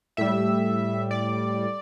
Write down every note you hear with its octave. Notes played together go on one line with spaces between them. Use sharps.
A2 G3 E5
D5